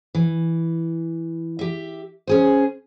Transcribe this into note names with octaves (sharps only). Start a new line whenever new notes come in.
E3
G4 E5
C#4 G#4 C5